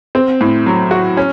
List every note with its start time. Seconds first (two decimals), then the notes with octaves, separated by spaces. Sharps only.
0.15 C4
0.41 A2
0.66 F#3
0.91 F#4
1.17 C#4